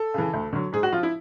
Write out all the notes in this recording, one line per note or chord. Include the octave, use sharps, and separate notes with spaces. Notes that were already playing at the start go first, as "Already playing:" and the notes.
Already playing: A4
C#3 E3
D2
D3 F#3
G#2 G#4
F#4
F3 F4
E4